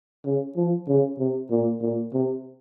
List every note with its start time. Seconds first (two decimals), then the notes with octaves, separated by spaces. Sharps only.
0.25 C#3
0.57 F3
0.88 C#3
1.19 C3
1.51 A#2
1.82 A#2
2.13 C3